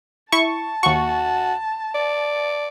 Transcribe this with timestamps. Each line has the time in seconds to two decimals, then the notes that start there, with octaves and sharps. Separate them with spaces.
0.32 E4 A5 C#6
0.83 D#2 F#4 C#6
1.95 D5